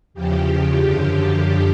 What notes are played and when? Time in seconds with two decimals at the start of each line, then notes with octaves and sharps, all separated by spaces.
0.14 E2 C#3 F3 G4
0.82 F#2 D3 F3 G4